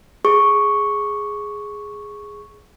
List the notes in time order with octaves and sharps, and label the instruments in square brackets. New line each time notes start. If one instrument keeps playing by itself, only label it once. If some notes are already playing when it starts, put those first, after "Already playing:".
[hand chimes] G#4 C#6